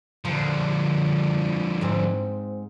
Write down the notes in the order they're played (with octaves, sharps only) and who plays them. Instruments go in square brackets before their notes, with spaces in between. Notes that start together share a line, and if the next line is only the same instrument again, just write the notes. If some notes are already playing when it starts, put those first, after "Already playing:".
[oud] A#2 [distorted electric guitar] D3 F3
[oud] G#2 C4